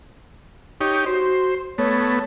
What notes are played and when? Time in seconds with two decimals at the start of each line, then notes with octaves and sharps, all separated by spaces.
0.81 D#4 G4 C#5
1.06 F#4 C5
1.78 A3 B3 C#5